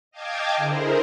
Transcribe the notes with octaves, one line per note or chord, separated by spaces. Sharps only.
D#5 F5 G5 A5 D6 G#6
D3 E4 G#4 A#4 C5